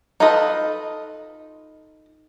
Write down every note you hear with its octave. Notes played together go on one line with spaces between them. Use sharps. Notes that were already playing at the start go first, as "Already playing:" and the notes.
D#4 F4 A4 B4 D#5